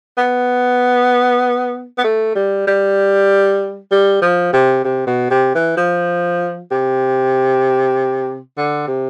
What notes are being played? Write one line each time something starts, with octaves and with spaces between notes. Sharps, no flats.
B3
B3
A3
G3
G3
G3
F3
C3
C3
B2
C3
E3
F3
C3
D3
C3